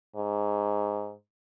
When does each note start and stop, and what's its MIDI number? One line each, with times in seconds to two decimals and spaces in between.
0.16 1.13 44